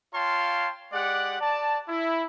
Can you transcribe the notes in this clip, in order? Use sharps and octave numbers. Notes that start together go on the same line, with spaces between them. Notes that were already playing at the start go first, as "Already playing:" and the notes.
F4 C#5 F5 G5 A5 C6
G#3 G4 D5 F#5
D5 A5
E4